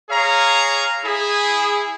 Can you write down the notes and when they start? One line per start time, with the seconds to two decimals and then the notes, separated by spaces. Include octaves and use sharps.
0.11 G#4 C#5 F5 A#5
1.05 E4 G#4